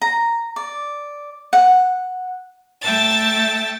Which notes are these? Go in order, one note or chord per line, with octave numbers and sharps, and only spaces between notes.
A#5
D5
F#5
A3 E5 G5 A5 A6